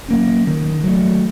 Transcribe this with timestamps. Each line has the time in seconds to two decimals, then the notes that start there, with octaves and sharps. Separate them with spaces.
0.08 F#3 A#3 C#4
0.47 D#3
0.84 F#3 A3